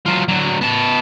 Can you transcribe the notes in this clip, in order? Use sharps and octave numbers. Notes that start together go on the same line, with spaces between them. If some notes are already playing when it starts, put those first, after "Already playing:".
F#3 F4
D3 F#3
B3 A5